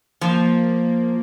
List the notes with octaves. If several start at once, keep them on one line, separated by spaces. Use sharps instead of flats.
F3 A#3